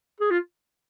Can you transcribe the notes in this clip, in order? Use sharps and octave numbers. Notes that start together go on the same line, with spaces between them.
G#4
F4